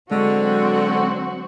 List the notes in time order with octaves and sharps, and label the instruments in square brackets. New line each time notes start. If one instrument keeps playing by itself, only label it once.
[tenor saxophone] D3 [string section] F#3 C4 F#4 [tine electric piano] G#3